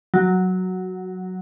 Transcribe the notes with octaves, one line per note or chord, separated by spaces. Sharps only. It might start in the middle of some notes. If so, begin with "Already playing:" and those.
F#3